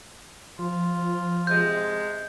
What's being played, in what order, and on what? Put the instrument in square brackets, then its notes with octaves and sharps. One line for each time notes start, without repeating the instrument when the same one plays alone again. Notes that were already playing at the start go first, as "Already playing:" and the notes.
[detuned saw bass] F3 [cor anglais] F4
[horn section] C3 G#3 [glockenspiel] G6